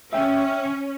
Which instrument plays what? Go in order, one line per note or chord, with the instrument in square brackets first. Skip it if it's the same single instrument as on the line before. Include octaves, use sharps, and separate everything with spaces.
[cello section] C#4 [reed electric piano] E5 G5